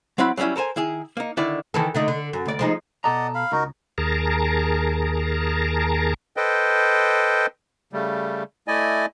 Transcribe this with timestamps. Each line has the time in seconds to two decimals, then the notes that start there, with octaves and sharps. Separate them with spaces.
0.18 F#3 C4 E4 F#5 B5
0.37 F#3 G3 A#3 C#4 E4
0.56 A4 A#4 C5 G#5
0.76 D#3 E4 G#4
1.17 A#3 D#4
1.37 D3 D#3 E4 D5
1.74 D#3 E3 A4
1.95 D3 A3 D#4
2.08 D3
2.33 F#2
2.46 D2 D5
2.59 F3 G#3 D#4
3.04 B2 A4 D5 D#5 F#5 A#5
3.35 F5 B5
3.52 C#2 D#4 F#4 A#4
3.98 D#2 G#4 A#4 A5 A#5
6.37 A4 B4 C5 D#5 G5
7.93 C#3 G3 A3
8.68 A3 E4 D5 D#5 G#5